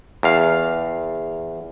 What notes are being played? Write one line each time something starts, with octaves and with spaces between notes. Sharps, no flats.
E2 F5